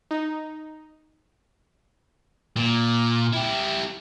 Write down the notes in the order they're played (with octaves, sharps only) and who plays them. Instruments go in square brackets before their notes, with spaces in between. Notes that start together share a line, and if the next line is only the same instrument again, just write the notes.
[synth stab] D#4
[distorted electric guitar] A#2
E4 G4